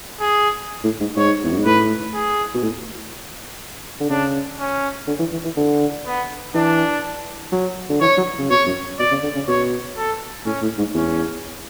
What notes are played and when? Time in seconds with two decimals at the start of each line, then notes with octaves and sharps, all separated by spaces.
0.20 G#4
0.84 A2
1.00 G#2
1.16 G#2 C#5
1.44 E2
1.51 F#2
1.58 G#2
1.65 A2 B4
2.14 G#4
2.54 B2
2.63 A2
4.00 D3
4.10 C#3 D4
4.59 C#4
5.07 D3
5.19 E3
5.32 E3
5.44 E3
5.57 D3
6.06 B3
6.54 E3 D4
7.52 F#3
7.89 D3
8.01 E3 C#5
8.17 F#3
8.38 C#3
8.50 B2 C#5
8.66 F#2
8.99 B2 D5
9.11 C#3
9.23 D3
9.35 C#3
9.47 B2 C#5
9.96 A4
10.46 A2 C#4
10.62 A2
10.78 G#2
10.94 E2 C#4